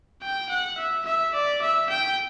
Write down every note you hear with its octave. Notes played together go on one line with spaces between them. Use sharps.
G5
F#5
E5
E5
D5
E5
G5